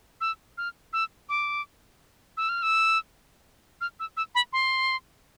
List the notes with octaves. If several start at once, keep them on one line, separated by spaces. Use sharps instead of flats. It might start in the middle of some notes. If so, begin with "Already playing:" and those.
E6
F6
E6
D6
E6
F6
E6
F6
E6
E6
B5
C6